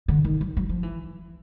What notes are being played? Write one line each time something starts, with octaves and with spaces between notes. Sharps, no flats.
D3
D#3
F#3
F#3
F3
E3